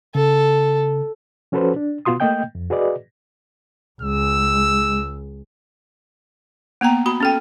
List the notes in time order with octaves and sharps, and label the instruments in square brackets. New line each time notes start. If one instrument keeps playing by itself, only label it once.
[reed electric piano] C#3 [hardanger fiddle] A4
[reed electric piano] F3 C#4 F#4 A4 B4 C5
D4
B2 B3 F4 F#4 C6 D#6
A3 A#3 D#5 G5 G6
F2
F#4 G#4 B4 D5 D#5
[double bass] C#2 G#3 [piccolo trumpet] E6
[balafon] A#3 B3 G5 A#5
F#4 B5
C#4 A4 G5